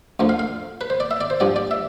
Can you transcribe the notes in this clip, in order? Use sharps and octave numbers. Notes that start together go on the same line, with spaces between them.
D2 D3 F3
F5
F5
B4
C5
D5
E5
D5
C5
G2 F3 D5
D5
E5